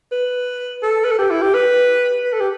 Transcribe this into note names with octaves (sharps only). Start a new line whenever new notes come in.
B4
A4
B4
A4
G4
E4
G4
B4
B4
A4
G4